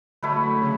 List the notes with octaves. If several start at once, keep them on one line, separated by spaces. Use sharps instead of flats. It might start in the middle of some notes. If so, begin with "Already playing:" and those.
D3 F#3 A3 E4 B4
C#3